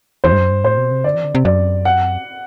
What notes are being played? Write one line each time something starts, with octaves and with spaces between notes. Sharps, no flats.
E2 C5
G2
F#2
G2
A2 C5
B2
C3
D3 D5
E3
D3
C3
F#2 D5
F#5